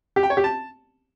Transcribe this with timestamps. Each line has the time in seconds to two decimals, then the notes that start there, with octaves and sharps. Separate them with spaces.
0.16 G4
0.23 G5
0.30 C#5
0.37 G4
0.44 A5